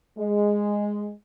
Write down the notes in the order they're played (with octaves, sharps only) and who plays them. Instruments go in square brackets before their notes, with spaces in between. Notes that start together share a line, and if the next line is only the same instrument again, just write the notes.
[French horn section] G#3